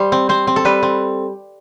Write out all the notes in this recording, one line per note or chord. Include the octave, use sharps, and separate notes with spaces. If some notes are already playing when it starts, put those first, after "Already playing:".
Already playing: G3 C5
C4
C4 C5
C4
A4
G3 B4
C4